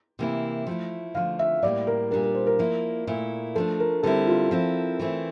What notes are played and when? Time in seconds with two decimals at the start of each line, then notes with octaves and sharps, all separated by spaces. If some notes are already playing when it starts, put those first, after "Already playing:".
0.19 C3 E3 A#3 E4
0.67 F3 A3 E4
1.15 D3 F3 A3 F5
1.39 E5
1.62 A2 G3 A#3 E4 D5
1.87 A#4
2.11 A#2 G3 D4 A#4
2.23 A#4
2.35 C5
2.46 A#4
2.59 F3 A#3 E4
3.07 A#2 A3 E4
3.55 F3 A3 D4 A4
3.80 A#4
4.03 D3 G3 C4 E4 A4
4.27 F4
4.51 F3 C4 E4
4.99 E3 A3 C4 E4